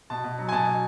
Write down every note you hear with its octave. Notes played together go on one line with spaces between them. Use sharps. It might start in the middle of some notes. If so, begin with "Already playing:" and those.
B2 A5
B2
F#3
G#5
B2 A5
B2